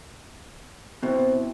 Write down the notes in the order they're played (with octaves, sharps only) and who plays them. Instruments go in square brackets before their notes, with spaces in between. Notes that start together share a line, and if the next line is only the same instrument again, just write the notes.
[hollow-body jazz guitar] B2 [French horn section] C4 E4 C5